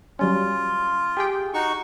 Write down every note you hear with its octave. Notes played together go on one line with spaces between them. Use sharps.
F#3 G3 C#4 F4
G4 G#4 G5
D#4 F#4 C#6